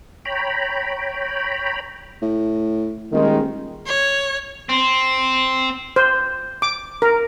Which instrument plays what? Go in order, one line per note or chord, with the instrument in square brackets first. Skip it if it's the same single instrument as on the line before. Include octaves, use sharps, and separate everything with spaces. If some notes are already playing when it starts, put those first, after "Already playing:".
[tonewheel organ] C#5 G5 A#5 B5
[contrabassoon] A2
[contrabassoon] D#1 [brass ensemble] D#3 G#3
[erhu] C#5
[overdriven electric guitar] C4
[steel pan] C5
D6
A#4